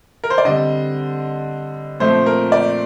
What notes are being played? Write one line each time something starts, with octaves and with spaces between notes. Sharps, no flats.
A#4
C5
D5
D3 G3 C4 D#5
A#2 F3 A3 C4 C5
A#4
D5